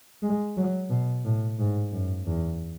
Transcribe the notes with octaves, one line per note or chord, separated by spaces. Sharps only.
G#3
F#3
B2
A2
G#2
F#2
E2